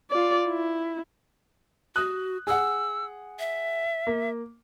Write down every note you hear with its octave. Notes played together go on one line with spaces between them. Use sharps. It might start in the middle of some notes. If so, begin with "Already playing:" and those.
F4 D5
E4
F#4 D#6 F#6
G#4 F#5 E6
E5
A#3